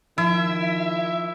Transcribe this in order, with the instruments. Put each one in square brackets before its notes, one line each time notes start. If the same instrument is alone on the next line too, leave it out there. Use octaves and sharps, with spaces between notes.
[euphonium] D#3 [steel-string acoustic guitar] F3 [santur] E4 [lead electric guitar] E5